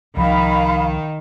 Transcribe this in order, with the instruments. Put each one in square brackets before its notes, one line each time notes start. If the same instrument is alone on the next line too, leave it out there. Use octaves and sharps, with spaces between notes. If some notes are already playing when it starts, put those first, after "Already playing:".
[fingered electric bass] C2 F3 [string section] D#3 [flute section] F5 B5